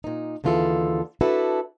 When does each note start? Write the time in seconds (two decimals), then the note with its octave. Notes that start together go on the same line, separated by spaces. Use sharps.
0.04 A#2 D#4
0.44 D#2 D3 E3 F4 G#4 A4
1.21 D4 E4 F#4 A4 B4